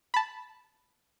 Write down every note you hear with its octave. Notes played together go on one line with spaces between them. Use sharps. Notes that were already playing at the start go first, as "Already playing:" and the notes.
A5 B5